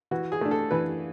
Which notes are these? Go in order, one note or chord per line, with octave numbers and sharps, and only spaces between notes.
E3 F#4
G#4
A3 D4
A4
E3 B4